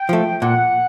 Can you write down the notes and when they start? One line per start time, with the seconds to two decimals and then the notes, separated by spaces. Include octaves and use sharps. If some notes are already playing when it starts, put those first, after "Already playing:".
Already playing: G5
0.09 F3 A3
0.42 A#2 F#5